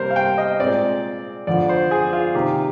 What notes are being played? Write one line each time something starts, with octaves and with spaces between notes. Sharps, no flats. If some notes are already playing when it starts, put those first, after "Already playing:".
Already playing: C3 G3 A#3 A#4 C5
F5
G5
D#5
A#2 G#3 C4 D5
F2 D3 F3 D5
C5
G#4
F4
C3 D#3 A#3 G4